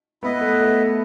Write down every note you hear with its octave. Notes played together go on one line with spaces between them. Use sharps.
B3 E4 B4 D#5 F#5
A3
A3